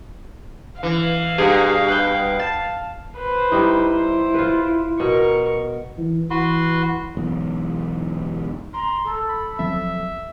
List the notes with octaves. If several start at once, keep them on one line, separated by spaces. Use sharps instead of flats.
E3 F5
G2 B2 G4 G#4 G#5
B4 G5
A5
B4 C5
G3 D#4 E4
C5
F4 B4
B2 A#4 C#6
E3
E3 F#4 B4 C6
B1 E2 G#2
A#5 C6
A4
B5
F3 F#3 C4 E5